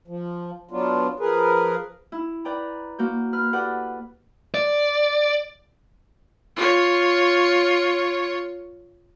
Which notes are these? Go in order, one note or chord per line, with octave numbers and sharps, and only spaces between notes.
F3
F#3 B3 D4 F4
F3 G#4 A#4 B4
E4
B4 D5 G5 A#5
A#3 F#4 G6
B4 F6
G4 A4 B4 D5 F#5
D5
F4 C#5